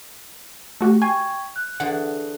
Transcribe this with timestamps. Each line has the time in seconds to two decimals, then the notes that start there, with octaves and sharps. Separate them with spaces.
0.81 A3 F#4 G4
1.02 G5 G#5 C#6 G#6
1.56 F#6
1.80 D3 E3 G#4 F#5